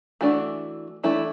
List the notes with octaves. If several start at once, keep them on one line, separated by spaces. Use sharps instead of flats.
E3 A3 D4 F#4
E3 A3 D4 E4